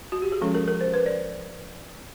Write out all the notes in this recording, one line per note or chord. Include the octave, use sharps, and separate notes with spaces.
F#4
G4
G#4
F3 G#3 C#4 A4
A#4
A#4
C5
B4
D5